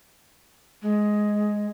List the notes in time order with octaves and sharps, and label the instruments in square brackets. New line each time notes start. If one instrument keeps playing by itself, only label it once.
[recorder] G#3